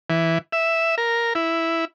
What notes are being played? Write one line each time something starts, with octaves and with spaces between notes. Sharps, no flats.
E3
E5
A#4
E4